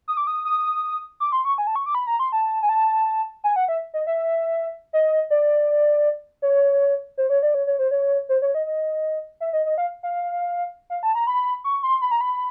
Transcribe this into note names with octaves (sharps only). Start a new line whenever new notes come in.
D#6
D6
D#6
D#6
D6
C6
C#6
G#5
A5
C#6
D6
B5
A#5
C6
A5
G#5
A5
G#5
F#5
E5
D#5
E5
D#5
D5
C#5
C5
C#5
D5
C#5
C#5
C5
C#5
C5
C#5
D#5
D#5
E5
D#5
D#5
F5
F5
F5
A5
A#5
B5
C#6
C6
B5
A#5
B5